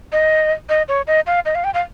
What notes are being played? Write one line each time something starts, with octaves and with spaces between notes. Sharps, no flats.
D#5
D#5
C#5
D#5
F5
D#5
F5
G5
F5